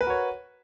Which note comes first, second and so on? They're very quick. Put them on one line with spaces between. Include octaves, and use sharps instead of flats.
B4 A#4 F#4 C#5